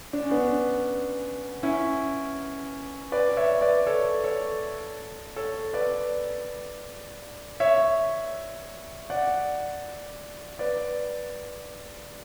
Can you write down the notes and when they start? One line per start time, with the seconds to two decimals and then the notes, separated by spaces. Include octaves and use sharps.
0.13 D4
0.23 C#4
0.31 B3 D4
1.63 C#4 E4
3.12 B4 D5
3.37 C#5 E5
3.61 B4 D5
3.87 A4 C#5
4.24 A4 C#5
5.36 A4 C#5
5.73 B4 D5
7.60 C#5 E5
9.10 D5 F#5
10.59 B4 D5